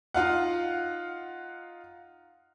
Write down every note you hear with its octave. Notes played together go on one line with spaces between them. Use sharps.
D#4 F4 F5 F#5